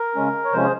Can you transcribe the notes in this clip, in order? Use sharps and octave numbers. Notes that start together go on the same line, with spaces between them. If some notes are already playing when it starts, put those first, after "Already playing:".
Already playing: A#4
C#3 G#3 C#4
C#5
C3 F3 G#3 C#4 C5
G#4